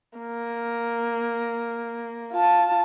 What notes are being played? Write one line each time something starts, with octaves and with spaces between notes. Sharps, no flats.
A#3
F4 A5